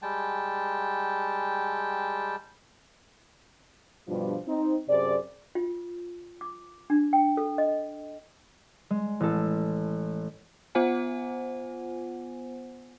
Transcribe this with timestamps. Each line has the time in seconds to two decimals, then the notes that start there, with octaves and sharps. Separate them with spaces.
0.02 G3 G#3 G5 A5
4.07 G2 B2 F3 G3 D4 F4
4.47 C4 D#4
4.87 F#2 C3 G#4 C5 D5
5.55 F4
6.41 D6
6.90 D4
7.13 G5
7.37 A4
7.58 D#5
8.90 G#3
9.20 A1 A4
10.75 B3 F4 C5 F#5 G#5